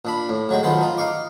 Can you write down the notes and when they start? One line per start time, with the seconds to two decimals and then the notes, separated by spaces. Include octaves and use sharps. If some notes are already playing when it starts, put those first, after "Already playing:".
0.05 A#2 D4 B5
0.29 A2
0.49 A2 F#3 G#3 G5
0.63 B1 D#3 F3 B4 C5 F#5
0.81 D#4 F4
0.97 D#4 F5 C#6 D6